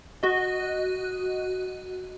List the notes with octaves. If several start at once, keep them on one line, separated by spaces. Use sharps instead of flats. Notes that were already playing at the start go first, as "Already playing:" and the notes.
F#4 D#5